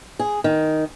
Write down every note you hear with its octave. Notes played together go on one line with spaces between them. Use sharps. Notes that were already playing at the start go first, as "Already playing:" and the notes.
G#4
D#3